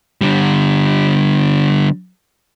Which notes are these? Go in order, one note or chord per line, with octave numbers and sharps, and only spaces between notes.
D3 G3